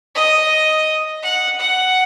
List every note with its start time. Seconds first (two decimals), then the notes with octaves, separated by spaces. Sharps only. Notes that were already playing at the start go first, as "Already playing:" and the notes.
0.15 D#5
1.22 F#5
1.59 F#5